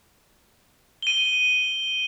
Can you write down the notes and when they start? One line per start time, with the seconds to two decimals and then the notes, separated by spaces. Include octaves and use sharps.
1.02 D#7 G7